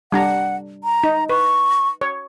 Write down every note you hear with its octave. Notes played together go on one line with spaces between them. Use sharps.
G3 D4 F#5 A#5
A#5
D#4
B4 C#6
C#5